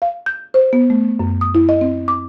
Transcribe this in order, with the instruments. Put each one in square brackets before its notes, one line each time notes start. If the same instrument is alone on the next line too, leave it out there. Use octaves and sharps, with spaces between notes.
[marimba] F5
G6
C5
B3
A3
F#2
D#6
E4
D#5
C4
D6